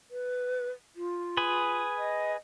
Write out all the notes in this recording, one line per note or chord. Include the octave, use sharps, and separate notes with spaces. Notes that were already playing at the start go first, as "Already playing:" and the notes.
B4
F4
G#4 B4
D#5